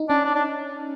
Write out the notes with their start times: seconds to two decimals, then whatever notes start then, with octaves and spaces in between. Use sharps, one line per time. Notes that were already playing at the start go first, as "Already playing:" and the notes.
Already playing: D#4
0.09 C#4 D4
0.25 D4
0.35 D4